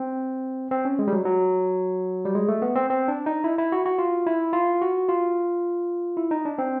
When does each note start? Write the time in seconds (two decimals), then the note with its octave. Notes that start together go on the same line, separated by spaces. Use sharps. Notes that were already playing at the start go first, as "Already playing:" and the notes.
Already playing: C4
0.71 C4
0.85 C#4
0.99 G#3
1.08 G3
1.13 F#3
1.25 F#3
2.25 G3
2.35 G#3
2.48 A3
2.62 B3
2.76 C4
2.90 C4
3.08 D4
3.26 D#4
3.44 E4
3.58 E4
3.72 F#4
3.86 F#4
3.98 F4
4.27 E4
4.53 F4
4.82 F#4
5.09 F4
6.17 E4
6.31 D#4
6.45 D4
6.58 C4